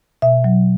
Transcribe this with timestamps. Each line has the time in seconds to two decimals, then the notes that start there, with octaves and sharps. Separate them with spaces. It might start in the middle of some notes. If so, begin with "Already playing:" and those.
0.22 B2 E5
0.44 F#3